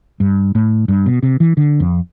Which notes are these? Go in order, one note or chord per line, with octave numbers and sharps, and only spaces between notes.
G2
A2
G2
B2
C3
E3
D3
F2